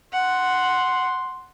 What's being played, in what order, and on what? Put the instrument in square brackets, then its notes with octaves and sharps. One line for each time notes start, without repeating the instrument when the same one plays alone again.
[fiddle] F#5 [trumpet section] C6